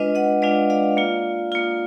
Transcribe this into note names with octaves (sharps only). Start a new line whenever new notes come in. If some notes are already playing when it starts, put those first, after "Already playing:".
Already playing: G#3 D4 F4 B4 D#5
D#5 F#5
G#3 D4 F4 D5 F5
D5 F5
A#3 F4
A#3 F4